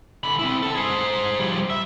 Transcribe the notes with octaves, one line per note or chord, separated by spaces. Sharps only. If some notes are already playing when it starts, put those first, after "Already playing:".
D3 B5
C4 E4
D3 A4
G#4 C5
F3 G3
E5